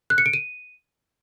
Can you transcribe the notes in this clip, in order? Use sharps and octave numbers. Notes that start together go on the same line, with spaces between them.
F#6
C#7
D7
D#7